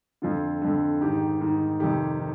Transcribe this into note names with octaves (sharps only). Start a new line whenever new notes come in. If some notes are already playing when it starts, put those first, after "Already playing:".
F2 D3 F4
F2 D3
G#2 D#3 G4
G#2 D#3
F2 C3 D#3 G4
D#3